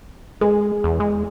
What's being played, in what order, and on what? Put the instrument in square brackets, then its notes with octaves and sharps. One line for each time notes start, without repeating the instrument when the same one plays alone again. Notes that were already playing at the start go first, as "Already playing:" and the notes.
[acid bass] G#3 [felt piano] G#4
[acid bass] E2
G#3